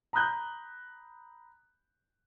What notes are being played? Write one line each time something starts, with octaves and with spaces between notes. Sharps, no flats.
A#5 B5 D#6 F#6 G6